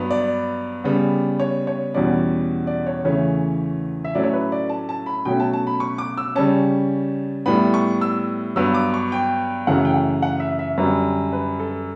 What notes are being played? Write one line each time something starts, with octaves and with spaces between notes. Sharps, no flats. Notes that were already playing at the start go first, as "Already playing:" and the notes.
Already playing: G2 F#3 B3
D5
C#3 G3 B3
C#5
C#5
E2 B2 G3 C#4 D5
D5
C#5
E2 C#3 E3 A3 C#4
E5
A2 F#3 A3 C#4 D5
C#5
B4
D5
A5
A5
B5
B2 F#3 A3 C#4 G5
A5
A5
B5
C#6
D6
E6
C#3 G3 C#4 A5
A2 G3 B3 B5
C#6
E6
G2 F#3 B3 E6
D6
C#6
G5
F#2 C#3 E3 A3 F#5
G5
F#5
F#5
E5
E5
F#2 D3 G3 B4
B4
A4